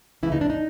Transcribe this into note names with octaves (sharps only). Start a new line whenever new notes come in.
D2 C#3 E3 E4
D#4
D4
D#4